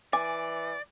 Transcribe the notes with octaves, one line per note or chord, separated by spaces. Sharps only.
E3 D5 G#5 D6